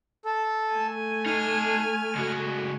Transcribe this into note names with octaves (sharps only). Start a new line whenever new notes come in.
A4
A3 G#5
D#4 A5 F6
C#2 F#4